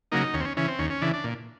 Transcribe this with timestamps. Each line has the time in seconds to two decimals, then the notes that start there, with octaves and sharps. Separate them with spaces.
0.12 C#3 F#3 A#3 D#4
0.34 D#2 C#4
0.40 C4
0.45 C#4
0.56 C#3 E3 C#4
0.68 C4
0.79 D#2 C#4
0.90 C#4
1.02 C#3 E3 D4
1.14 D4
1.24 A#2